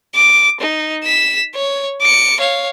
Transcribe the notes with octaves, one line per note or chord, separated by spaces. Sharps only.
D6
D#4
B6 E7
C#5
D6 C#7
C#5 F5